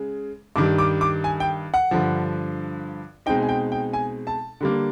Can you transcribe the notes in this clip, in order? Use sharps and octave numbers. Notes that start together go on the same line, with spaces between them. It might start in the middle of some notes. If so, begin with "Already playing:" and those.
Already playing: C#3 G#3
G2 D#3 G3 D6
D6
D6
G#5
G5
F#5
G2 D3 F3
B2 G#3 C4 D#4 G5
G#5
G5
G5
G#5
A5
D3 G3 A#3